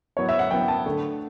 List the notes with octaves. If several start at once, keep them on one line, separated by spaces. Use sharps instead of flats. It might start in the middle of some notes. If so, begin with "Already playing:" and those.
A2 F#3 B3 C#5
E5
F#5
A2 F#3 B3 G5
A5
D3 A3